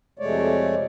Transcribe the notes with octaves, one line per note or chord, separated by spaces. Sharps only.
F2 C3 G#3 A3 C#5 D5